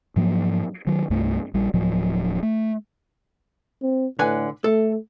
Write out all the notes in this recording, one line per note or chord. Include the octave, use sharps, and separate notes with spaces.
G#2 F3 F#3 A#3
D#3 F#3
C2 G2 G3 A3
A#1 G3
D1 A2 F3 F#3
A3
C4
A2 D3 B4 G#5
A3 A4